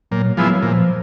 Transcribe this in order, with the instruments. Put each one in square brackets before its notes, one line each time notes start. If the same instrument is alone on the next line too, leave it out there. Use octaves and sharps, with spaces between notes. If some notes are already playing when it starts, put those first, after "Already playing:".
[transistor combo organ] A#2 [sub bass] F#3
[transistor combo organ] F3 G#3 B3 E4 [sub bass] F#3
[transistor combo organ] A#2 [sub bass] F3